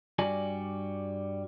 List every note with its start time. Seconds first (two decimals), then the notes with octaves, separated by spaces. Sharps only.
0.19 G2 G3 F#4 D5 G#5